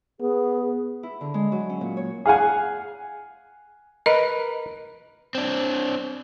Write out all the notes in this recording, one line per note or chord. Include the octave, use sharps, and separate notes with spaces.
B3 G#4
E4
D3
G#3
F#3
C#4
A#2
C#5
G#4 F5 F#5 G#5
A#4 B4 D#5
C4 D4